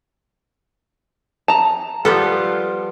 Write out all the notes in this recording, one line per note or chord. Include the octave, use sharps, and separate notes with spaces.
A5 A#5
F3 G3 B3 F4 A4